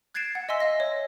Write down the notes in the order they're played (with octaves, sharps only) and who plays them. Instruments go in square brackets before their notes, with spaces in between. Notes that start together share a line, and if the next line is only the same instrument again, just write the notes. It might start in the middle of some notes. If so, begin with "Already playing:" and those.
[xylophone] F#6 G#6 A6 C7 D7 E7
F#5
D#5 E5 G#5 C6 E6 B6
D#5 F5 A#6
C#5